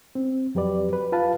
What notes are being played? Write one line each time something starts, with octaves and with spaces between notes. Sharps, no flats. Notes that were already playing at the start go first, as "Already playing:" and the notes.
C4
F2 F#3 G4 B4 D5
B4
F4 B4 F5 A5